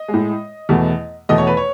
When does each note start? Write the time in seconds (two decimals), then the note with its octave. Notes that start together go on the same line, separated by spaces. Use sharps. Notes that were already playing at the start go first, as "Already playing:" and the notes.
Already playing: D#5
0.08 G#3
0.14 A2
0.69 E2 B2 A3
1.29 E2 B2 A3 D#5
1.38 C#5
1.47 B4
1.57 C#5